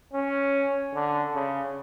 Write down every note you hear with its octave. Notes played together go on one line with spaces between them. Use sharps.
C#4
D3
C#3